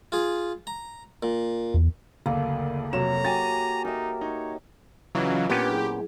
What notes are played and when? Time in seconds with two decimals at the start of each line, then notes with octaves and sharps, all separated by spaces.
0.12 F4 G#4
0.67 A#5
1.23 A#2
1.74 E2
2.26 F#1 D2 A#3 A4
2.93 F1 C3 F#3 C#5 A#5 E7
3.25 F#4 G4 G#5 A6
3.85 D#4 A#4 E5
4.21 D#4 C#5
5.15 C#3 E3 F#3 F4 D#5 F5
5.50 A#2 B3 C#4 D4 G4 B4
5.69 F#3 E4 G#4